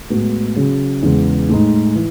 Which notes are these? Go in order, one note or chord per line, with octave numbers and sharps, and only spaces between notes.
A2 G#3 B3 F#4
C#3 F#3 C#4 G#4
E2 C#3 G#3
A2 G#3 D#4
E3